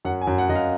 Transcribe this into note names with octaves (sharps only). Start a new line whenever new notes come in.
F#2 F#5
G#5
F#2
F#5
F#2 D#5
F5